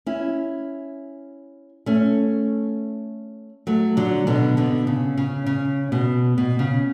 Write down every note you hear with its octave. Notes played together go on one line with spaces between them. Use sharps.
C#4 E4
A3 C#4
F#3 A3
D3 F#3
B2 D3
B2 D3
C#3
C#3
C#3
B2
B2
C#3